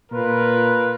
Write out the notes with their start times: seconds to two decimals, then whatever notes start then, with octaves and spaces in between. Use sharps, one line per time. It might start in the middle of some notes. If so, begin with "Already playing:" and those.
0.12 A#2 F4 A#4 B4